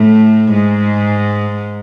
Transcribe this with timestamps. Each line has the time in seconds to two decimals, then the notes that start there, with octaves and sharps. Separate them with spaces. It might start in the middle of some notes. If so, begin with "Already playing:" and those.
Already playing: A2 A3
0.53 G#2 G#3